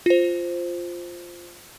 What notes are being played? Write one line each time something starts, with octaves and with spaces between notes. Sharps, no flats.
F4 C5